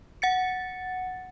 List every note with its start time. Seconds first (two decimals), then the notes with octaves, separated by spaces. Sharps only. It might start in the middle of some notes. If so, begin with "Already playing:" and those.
0.22 F#5 A6 C#7